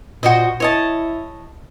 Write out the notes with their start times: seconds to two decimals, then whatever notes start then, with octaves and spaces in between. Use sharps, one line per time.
0.23 A#2 F#4 C5 D#5
0.60 E4 C#5 D#5 A5